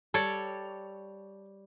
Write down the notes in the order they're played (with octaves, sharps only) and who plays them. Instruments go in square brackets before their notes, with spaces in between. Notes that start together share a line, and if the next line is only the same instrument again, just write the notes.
[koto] G3 C#5 D5 [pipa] A4